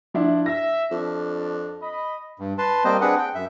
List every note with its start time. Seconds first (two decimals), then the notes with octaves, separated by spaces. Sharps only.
0.14 F3 D4 E4
0.46 E5 A#6
0.91 F2 D4
1.80 D#5 B5
2.39 G2
2.58 B4 A5 C6
2.85 G3 A#3 C4 C5 D#5
3.01 C4 D4 G#4 B4 F#5
3.18 G5
3.35 F#2 E5